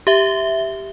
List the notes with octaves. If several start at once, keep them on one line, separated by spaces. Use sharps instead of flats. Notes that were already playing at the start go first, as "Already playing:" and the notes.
G4 E5 G7